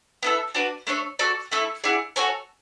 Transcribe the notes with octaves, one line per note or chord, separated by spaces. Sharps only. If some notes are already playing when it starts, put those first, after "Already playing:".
B3 E4 A4 E5
D4 F#4 B4 D5
A3 D4 A4 C#5
F#4 A4 D5
A3 E4 A4
E4 G#4 D5 F#5
F#4 A4 C#5 G#5